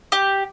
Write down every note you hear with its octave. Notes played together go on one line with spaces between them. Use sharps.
G4